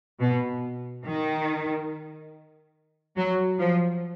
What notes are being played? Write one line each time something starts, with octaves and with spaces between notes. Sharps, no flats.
B2
D#3
F#3
F3